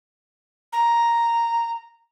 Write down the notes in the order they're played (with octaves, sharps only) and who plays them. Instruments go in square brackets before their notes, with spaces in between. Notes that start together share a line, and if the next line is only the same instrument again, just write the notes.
[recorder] A#5